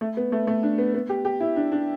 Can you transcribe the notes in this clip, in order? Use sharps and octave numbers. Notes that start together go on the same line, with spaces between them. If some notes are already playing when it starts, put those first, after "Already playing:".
A3
B3
A3
A3
D4
B3
B3
G4
G4
E4
D4
D4